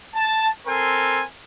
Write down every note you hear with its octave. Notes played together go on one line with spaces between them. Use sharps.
A5
C4 A4 A#4 G#5 C6